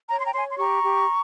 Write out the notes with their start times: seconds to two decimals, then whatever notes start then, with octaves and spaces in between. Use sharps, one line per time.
0.11 C#5 A#5
0.19 C6
0.26 G5 A#5
0.35 C#5 G#5 C6
0.50 C6
0.58 G4 A#5 C#6
0.83 G4